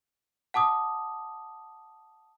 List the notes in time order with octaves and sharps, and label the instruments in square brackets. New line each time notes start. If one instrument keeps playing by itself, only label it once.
[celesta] F#5 A5 D6 D#6